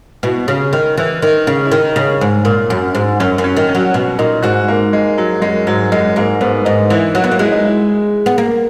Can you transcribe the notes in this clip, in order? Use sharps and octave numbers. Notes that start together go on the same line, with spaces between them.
B2 E4
C#3
D#3
E3
D#3
C#3
E4
D#3 D#4
C#3
G#2
A#2
F#2
G#2
F#2 C#4
F#2
C#4
D#3
C#4
F#3
B2
A#2 D#4
G#2 F#4
A#3
G#3
F#3
F#2 G#3
G#2 F#3
F#2 G#3
G#2 A#3
G#2 B3
G#2 D#4
E3 E4
F#3 F#4
B3
A#3
G#3 E4
D#4
E4
B3
A#3